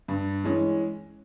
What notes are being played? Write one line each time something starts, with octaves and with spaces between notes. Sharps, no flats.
G2
E3 G#3 C#4